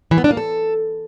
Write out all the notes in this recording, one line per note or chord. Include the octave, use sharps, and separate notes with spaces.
E3
B3
D4
A#3
A4